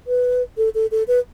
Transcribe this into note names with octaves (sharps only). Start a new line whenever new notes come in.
B4
A4
A4
A4
B4